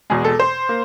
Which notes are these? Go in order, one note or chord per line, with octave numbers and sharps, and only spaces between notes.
E2 B2 G#3 G#4
A4
C5
A#3